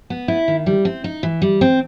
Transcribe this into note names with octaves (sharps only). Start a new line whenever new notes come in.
B3
E4
D#3
G3
C4
D#4
E3
G3
C4